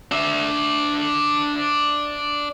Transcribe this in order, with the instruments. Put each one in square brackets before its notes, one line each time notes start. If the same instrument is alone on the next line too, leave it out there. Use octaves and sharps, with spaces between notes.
[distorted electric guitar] D4 E5